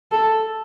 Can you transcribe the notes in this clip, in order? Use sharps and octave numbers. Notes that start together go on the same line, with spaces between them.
A4